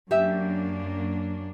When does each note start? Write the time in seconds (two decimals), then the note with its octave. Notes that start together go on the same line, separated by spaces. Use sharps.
0.11 F#2 A#3 D4 G4 E5